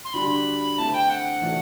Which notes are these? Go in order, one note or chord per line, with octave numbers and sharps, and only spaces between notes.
C6
D3 G3 D4 F#4 B5
D3 A3 C4 E4 A5
G5
F#5
E3 A3 D4 F#4